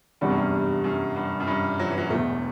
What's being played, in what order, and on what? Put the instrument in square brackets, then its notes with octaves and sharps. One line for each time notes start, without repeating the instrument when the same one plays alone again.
[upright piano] E2 C3 G3 D4 F#4 [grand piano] G2
[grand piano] F#2
G2
F#2
G2
F#2
G2
F#3
E3
F#3
[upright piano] E1 E2 B2 [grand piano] A3